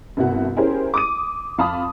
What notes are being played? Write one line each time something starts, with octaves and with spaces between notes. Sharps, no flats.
G1 C2 F#4
C#4 E4 G4 G#4 A#4 C5
D6 D#6 D#7
F2 F5 A5 B5 D#6